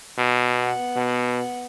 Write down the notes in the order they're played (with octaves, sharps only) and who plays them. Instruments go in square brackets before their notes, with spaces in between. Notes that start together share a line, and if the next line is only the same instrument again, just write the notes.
[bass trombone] B2
[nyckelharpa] B3 F#5
[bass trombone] B2